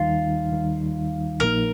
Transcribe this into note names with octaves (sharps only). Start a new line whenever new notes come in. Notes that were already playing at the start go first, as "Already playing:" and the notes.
Already playing: D#2 D#3 G3 D#4 F4
D#2 D#3 G3 D#4
A#1 A#2 F3 A#3 D#4 A#4